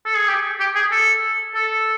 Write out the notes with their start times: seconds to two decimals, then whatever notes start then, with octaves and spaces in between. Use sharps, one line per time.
0.06 A4
0.16 G#4
0.28 G4
0.60 G4
0.75 G#4
0.91 A4
1.55 A4